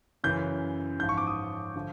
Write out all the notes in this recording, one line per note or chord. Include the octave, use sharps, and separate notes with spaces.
F#2 C#3 E3 G6
G#2 F3 G6
C#6
D6
D#6
D3 F3